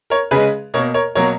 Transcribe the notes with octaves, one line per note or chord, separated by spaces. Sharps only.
A#4 C#5
C#3 G#3 G#4 B4
B2 A#3 A#4 C#5
A#4 C#5
B2 F#3 A#3 A#4 C#5